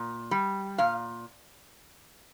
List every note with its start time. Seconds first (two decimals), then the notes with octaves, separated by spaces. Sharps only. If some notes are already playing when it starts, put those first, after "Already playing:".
Already playing: A#2
0.31 G3
0.78 A#2 F5